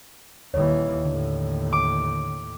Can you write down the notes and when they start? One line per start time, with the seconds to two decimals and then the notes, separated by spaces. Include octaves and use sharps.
0.54 D#1 D#2 E3 C#5
1.05 D#2 A2 D3
1.73 D6